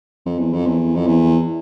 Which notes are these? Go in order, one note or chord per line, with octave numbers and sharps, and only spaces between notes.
F2
E2
F2
E2
F2
E2